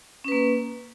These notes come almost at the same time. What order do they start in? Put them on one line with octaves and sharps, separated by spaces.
C#4 B4 A#3